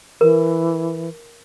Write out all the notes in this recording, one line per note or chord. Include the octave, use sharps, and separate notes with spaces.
E3 A#4